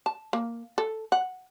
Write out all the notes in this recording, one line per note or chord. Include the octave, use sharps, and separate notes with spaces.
A5
A#3
A4
F#5